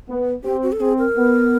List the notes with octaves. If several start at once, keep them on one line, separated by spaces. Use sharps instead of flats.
B3
C4 G4
F#4
A4
C4 G#4
A#4
B3